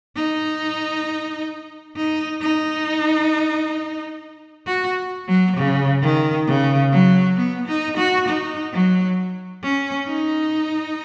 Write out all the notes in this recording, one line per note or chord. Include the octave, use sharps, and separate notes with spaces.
D#4
D#4
D#4
F#4
F#3
C#3
D#3
C#3
F#3
B3
D#4
F#4
D#4
F#3
C#4
D#4